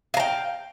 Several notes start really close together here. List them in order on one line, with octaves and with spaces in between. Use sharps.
F5 A#5 G5